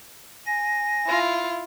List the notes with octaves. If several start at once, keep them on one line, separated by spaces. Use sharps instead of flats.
G#5 A#6
E4 F4